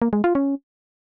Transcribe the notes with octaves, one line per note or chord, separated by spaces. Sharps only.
A#3
G#3
F4
C#4